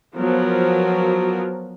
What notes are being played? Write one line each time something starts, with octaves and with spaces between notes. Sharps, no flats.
F3 F#3 B3 A#4